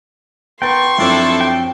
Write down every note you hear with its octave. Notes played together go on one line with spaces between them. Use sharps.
B3 G5 A#5 C6 C#6 A6
F#2 F3 C4 D4 E4 A4
G5